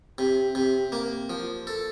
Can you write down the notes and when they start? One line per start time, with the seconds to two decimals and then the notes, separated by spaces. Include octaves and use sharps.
0.18 C3
0.55 C3
0.92 A#3
1.30 F3
1.67 A4